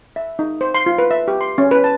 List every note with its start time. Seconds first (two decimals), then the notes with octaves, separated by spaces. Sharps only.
0.16 E5
0.39 D#4
0.61 C5
0.74 C6
0.86 F4
0.98 B4
1.11 E5
1.28 G4
1.41 C6
1.58 C#4
1.71 B4
1.84 A5